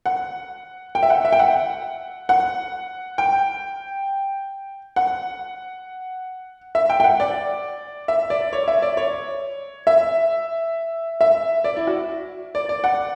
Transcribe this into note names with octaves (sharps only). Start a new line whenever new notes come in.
F#5
G5
E5
F#5
E5
G5
F#5
F#5
G5
F#5
E5
G5
G5
F#5
D5
E5
D5
C#5
E5
D5
C#5
E5
E5
D5
E4
F#4
D5
D5
F#5